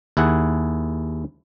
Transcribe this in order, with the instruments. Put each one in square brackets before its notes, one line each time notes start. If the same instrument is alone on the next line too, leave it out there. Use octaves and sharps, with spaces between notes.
[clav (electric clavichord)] D#2 E4 G#4 F#5